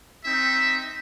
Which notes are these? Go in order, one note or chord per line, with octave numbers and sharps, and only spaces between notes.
C4 D#4 E5